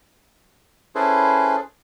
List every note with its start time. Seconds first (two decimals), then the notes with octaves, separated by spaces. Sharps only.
0.95 C#4 E4 G#4 A4 B4 C5